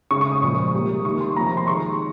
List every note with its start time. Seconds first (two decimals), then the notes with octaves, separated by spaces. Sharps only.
0.11 C#3 G#3 C#6
0.21 C#6
0.32 D#6
0.42 A#2 F3 G#3 C#6
0.74 C3 G3 A#3
1.05 D#3 G3 A#3 C#6
1.21 C6
1.36 C3 F3 A#3 A#5
1.47 A#5
1.57 C6
1.68 D#3 G#3 C#6